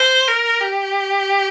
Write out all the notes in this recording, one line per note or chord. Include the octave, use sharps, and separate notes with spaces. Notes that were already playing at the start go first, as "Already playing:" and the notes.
Already playing: C5
A#4
G4